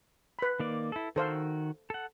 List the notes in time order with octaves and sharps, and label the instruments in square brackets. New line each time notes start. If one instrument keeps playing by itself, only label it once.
[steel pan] B4 B5
[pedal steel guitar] D#3 A#3 D5
E4 A4
[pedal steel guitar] D#3 F#4 E6 [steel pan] A4 C5 F5
[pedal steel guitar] A4 F#5